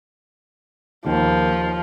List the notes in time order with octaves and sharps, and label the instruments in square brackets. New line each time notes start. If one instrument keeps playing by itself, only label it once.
[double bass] D#2 [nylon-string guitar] D#3 A#3 [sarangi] F3